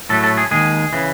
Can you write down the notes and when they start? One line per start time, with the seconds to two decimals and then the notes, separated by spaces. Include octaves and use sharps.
0.09 A2 F#3 A3 A4
0.24 A4
0.37 G#4
0.51 D#2 D#3 G#3 G#4
0.93 C#3 E3